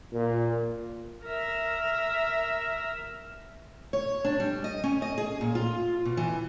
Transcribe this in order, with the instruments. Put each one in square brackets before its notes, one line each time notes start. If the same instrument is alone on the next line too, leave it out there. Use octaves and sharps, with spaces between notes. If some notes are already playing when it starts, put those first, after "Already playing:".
[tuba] A#2
[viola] A#4 E5
[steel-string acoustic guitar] C#5
D4
G3
D#5
C#4
D#5
G#4
A#2
F4
B2
E3